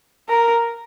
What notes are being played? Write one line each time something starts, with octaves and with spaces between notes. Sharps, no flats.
A#4